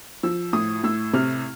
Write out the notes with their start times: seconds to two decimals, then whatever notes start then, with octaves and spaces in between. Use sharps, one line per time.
0.23 F3 E6
0.53 A2 D#6
0.84 A2 E6
1.13 C3 F6